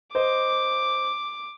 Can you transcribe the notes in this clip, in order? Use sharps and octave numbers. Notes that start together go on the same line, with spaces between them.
C5 D#5 D6